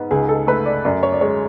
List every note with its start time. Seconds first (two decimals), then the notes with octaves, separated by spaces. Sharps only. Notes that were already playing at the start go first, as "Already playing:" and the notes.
Already playing: G#2 B3
0.11 C#2 G#4
0.29 A4
0.47 A3 B4
0.66 D5
0.85 F#2 D5
1.03 C#5
1.12 D5
1.21 G#3 C#5